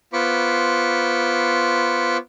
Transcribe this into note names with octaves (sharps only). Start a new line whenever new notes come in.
B3 F4 C5 B5 C#6 D6